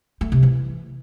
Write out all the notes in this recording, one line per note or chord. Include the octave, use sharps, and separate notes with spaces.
A3
C3
E3